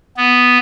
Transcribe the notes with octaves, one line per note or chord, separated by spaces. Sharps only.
B3